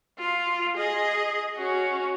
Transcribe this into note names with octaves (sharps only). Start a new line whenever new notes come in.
F4
G#4 D#5
C#4 F#4